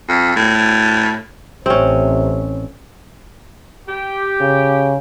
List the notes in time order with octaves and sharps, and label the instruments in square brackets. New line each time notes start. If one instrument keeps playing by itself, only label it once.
[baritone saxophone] F2
A2
[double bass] A1 [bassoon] C3 [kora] C4 C#4
[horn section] G4
[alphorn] C#3